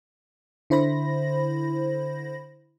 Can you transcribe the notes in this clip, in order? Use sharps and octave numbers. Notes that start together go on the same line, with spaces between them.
D3 E4 C5 B5 A#6